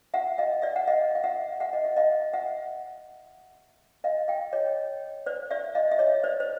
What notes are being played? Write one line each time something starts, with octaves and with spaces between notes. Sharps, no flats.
E5 F#5
D#5 F5
D5 E5
F#5
D#5 F5
F5
E5 F#5
E5 F#5
D#5
E5
D#5 F5
E5 F#5
D#5 F5
F5 G5
C#5 D#5
C5 D5
D5 E5
D#5 F5
E5
C#5 D#5
C5 D5
C5